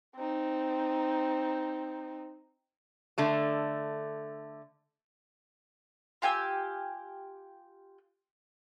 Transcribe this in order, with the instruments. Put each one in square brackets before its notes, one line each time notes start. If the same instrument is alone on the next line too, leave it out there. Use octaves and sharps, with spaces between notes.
[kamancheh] C4 D#4
[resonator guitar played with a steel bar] D3 A3 A5
[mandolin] F4 G4 G#5 E6